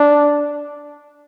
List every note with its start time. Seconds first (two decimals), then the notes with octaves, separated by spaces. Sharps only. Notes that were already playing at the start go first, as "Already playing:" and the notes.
Already playing: D4